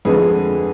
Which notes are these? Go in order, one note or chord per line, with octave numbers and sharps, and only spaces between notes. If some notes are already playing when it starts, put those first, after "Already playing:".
F2 D3 G#3 G#4 B4